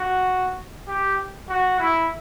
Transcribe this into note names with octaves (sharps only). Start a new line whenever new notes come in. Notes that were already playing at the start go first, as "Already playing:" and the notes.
Already playing: F#4
G4
F#4
E4